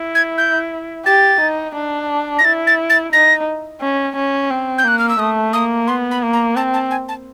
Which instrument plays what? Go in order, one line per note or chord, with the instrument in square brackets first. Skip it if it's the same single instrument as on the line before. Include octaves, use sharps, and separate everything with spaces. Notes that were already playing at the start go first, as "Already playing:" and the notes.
Already playing: [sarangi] E4
[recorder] G#6
G6
[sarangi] G4 [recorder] A6
[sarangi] D#4
D4
[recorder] A#6
[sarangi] E4 [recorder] A6
[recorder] A6
A6
[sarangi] D#4 [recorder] A#6
[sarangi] C#4
C#4
C4
[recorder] G6
[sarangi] A#3 [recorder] F#6
[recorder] F6
E6
[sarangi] A3 [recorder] D#6
[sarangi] A#3 [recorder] D#6
[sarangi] B3 [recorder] C6
[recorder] B5
[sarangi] A#3
[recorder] A#5
[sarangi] C4 [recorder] A5
[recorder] A5
G#5
A5